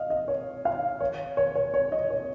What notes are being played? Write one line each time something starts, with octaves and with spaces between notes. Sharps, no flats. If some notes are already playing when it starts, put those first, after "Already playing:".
Already playing: D#5 F5
D#5
C#5
F5
C#5
C#5
C#5
C#5
D#5
C#5